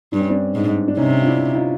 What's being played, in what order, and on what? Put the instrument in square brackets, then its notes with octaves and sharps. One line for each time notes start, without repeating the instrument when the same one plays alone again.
[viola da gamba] G2 [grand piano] D4
[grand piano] C#4
C4 D4
[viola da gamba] G#2
[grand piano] D4
[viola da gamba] C3 [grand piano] C#4 D#4
[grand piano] F4
D4 E4
D#4 F4